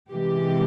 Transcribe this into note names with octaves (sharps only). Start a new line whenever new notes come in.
C3 E3 G#3 G4